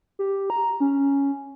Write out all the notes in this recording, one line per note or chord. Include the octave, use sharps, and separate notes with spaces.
G4
A#5
C#4